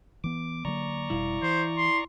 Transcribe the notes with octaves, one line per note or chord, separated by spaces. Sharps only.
E3 B3 D6
D3 F#3 A#3 D5 A#5 C#6
F1 B2 G3 E4 F5
E3 C5
C6